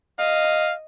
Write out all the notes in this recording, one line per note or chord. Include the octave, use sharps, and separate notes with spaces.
D#5 F5